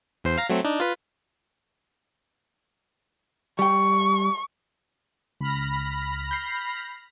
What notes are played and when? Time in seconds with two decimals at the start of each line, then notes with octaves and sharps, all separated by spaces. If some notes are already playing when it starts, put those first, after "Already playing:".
0.24 E2 C5 C7
0.38 F5 A#5
0.49 F#3 A3 C4
0.65 D4 D#4
0.80 F4 B4
3.59 G3 G5 C#6
5.41 C#2 B5 F6 A#6
6.31 G6 C7